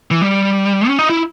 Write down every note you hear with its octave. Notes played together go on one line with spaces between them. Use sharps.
E3
G3
C#4
D#4
E4